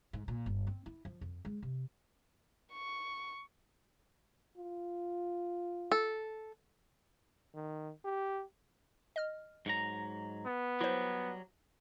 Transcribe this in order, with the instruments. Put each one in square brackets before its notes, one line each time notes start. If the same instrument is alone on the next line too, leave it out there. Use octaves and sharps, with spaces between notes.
[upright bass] G#2
A#2
G1
C4
E4
F3
F2
G#3
C3
[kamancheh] C#6
[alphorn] F4
[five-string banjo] A4
[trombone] D#3
G4
[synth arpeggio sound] D#5 F6
[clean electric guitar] G#2 F#3 A#5
[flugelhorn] B3
[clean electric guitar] F#3 G3 [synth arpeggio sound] E4 C5